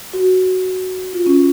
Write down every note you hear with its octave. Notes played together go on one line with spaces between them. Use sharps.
F#4
F4
C#4